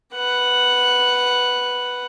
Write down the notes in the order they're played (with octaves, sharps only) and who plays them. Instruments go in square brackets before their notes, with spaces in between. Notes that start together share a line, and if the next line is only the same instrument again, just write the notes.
[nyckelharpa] B4 F#5